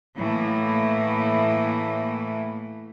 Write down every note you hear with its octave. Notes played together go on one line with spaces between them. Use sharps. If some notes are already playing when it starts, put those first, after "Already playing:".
A2 E3 A3 A#3